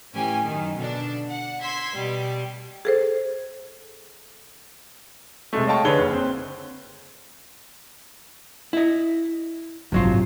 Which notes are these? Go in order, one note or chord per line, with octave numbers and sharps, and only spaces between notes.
A2 E3 C#4 G4 G#5
F#2 D#3
B2 D3 D4
F#5
C6 E6 G#6 B6
B2 G3
G#4 A4 C5
C3 G#3 A3
C#5 D#5 F5 G5 A5 C#6
D3 G#4 B4 C#5 F#6 G7
F#1
C4
E4 D#5
A1 G2 C3 F#3 F4